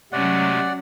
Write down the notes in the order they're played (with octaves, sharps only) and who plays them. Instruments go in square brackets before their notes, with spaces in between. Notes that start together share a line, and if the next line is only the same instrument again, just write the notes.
[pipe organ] C3 G#3 A3 [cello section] F#3 C#4 [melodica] D5 F#5